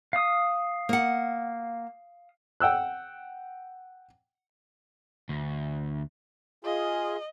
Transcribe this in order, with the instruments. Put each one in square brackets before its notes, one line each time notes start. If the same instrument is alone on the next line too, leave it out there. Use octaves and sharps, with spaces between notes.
[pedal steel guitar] F5 D#6
[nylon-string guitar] A#3 F#5
[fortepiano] F#5 G5 E6 F#6
[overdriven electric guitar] D2
[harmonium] F4 G#4 [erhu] D#5